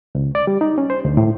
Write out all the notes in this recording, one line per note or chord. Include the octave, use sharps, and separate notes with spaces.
C#2
D5
G3
D#4
C#4
C5
D2
A2